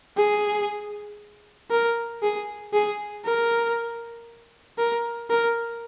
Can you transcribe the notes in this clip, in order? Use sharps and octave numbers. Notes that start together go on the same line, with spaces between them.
G#4
A#4
G#4
G#4
A#4
A#4
A#4